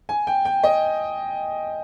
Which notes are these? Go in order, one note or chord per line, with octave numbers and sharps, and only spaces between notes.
G#5
G5
G5
D#5